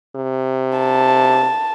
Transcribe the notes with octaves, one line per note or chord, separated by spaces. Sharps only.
C3
A5